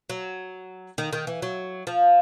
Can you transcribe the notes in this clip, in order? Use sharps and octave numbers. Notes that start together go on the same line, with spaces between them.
F#3
D#3
D#3
E3
F#3
F3